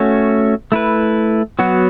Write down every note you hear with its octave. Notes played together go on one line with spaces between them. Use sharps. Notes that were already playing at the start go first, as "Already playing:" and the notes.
Already playing: A3 C#4 F#4 C#5
A3 E4 B4
F#3 B3 F#4 C#5